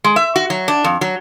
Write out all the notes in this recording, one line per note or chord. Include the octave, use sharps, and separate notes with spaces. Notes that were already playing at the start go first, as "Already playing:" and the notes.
G#3
E5
F#4
F#3
D4
F2
F#3